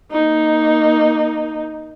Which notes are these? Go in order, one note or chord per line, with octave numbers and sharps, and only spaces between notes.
A#3 D#4